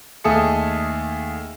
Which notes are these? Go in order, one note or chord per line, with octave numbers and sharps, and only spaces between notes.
D#2 A3 G#4 A4 D#6 C#7